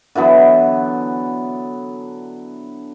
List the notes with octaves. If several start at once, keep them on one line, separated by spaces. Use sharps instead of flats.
D3 E3 F#3 B3